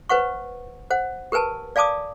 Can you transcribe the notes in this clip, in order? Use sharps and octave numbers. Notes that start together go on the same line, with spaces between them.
B4 C5 F#5 C#6
C5 F#5
G4 A#4 B4 G#5 A5
D5 F5 G#5 A5 D6 D#6